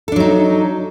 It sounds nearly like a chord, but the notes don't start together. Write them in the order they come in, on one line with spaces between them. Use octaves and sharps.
A4 D4 F#3 D#4